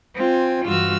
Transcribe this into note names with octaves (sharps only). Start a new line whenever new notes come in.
C4 F4 G5 G#5
G2 E3 F4 F#4 E6 F6